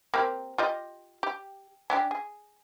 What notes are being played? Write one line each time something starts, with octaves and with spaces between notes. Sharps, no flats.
A#3 C4 G4
F4 G4 D#5
G4
C#4 D4 G4
G#4